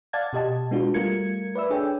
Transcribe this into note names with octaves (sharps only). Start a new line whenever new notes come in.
D5 F5 F#5 A5 G#6 A6
B2 G4 D#5 A5
G#3 B3 D4 F4 F#4
G3 A3 F4 A#4 G#6 C#7
B4 D5 E5 E6
D4 G#4 A4 C#5 D5 G5